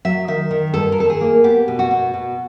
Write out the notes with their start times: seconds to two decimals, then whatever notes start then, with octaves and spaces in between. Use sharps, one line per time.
0.05 F#3 E5
0.28 D#3 E5
0.51 D#3
0.74 G2 A4
0.92 A#4
0.98 D#3 A4
1.10 G#4
1.21 A#3
1.44 B3 G4
1.68 B2
1.79 F#4
1.91 B2
2.14 B2